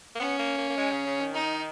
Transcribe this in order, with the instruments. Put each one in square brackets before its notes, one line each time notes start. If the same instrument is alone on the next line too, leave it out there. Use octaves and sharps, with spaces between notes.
[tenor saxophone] A#3
[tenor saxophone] B3 [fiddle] C#4
[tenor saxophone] A#3
A#3
A#3
G#3
C#3
C#3
D#3
[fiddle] D#4